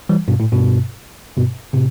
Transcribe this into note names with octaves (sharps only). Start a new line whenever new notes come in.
E3 G3
G2 B2
A2
G2 B2
G2 B2
A2 C3